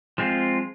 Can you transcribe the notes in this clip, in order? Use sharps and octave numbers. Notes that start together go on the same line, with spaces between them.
F3 G#3 C4 F4